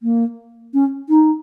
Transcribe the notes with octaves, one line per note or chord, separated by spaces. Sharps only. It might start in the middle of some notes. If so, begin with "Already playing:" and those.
A#3
C#4
D#4